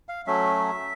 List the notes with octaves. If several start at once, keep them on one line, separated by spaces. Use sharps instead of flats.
F5
F#3 A3 C#4 E5